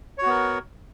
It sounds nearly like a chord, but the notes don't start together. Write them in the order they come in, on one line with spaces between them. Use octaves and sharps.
C#5 F#4 B3 A#4